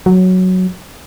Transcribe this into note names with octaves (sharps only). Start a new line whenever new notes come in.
F#3